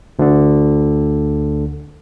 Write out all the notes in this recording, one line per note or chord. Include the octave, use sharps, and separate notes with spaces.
D2 D3